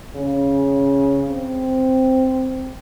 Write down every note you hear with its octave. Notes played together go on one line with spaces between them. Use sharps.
C#3
C4